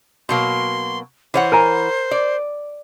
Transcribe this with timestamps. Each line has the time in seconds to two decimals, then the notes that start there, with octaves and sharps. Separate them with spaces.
0.29 B2 F#3 A#3 C6
1.34 E3 C5 C#5 F#5
1.52 A#4 G#5 A#5
2.11 D5